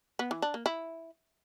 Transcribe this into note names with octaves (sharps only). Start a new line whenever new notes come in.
B3
E3
D4
A#3
E4